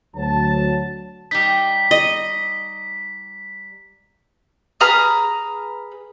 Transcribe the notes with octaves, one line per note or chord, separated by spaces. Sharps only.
D2 F#3 A5
G3 D#4 B6
D#5
G#4 B4 A#5 F6